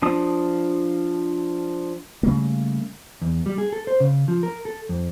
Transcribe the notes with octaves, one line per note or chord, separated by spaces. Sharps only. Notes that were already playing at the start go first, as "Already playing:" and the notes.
F3 D4 D#6
C#3 G3 A3 A#3
E2
G3
G#4
A4
C5
C#3
F3
A#4
A4
F2